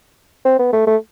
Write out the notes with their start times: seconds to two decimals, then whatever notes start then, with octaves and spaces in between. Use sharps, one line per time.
0.45 C4
0.59 B3
0.73 A3
0.87 A3